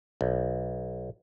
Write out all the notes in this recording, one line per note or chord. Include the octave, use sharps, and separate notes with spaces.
B1